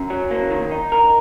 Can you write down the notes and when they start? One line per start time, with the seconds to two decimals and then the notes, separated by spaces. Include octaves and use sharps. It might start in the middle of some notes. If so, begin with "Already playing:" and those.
Already playing: F#2
0.10 F#3
0.31 A#3
0.51 D#3
0.72 D#4
0.92 A#4